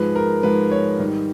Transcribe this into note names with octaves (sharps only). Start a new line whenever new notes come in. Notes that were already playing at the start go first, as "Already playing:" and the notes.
Already playing: G#2 F3 G#3 B4
A#4
G#2 F3 G#3 B4
C#5
G#2 D#3 G3